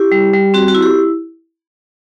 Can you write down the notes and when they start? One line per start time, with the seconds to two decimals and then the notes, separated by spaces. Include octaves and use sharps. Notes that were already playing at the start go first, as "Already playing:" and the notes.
Already playing: E4 G4
0.12 G3
0.34 G3
0.54 C4 F#4
0.68 F#4
0.75 E4
0.83 G4